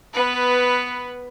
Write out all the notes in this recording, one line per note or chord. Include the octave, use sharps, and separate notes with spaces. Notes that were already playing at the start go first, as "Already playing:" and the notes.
B3 B4